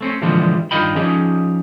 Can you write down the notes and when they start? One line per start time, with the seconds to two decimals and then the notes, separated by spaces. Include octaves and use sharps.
0.01 A3 C4 C#4
0.22 A#2 D3 E3 F3 G3 G#3
0.71 G2 D#3 F4 D#5 G5 B5
0.96 F3 C#4 D#4 G4 G#4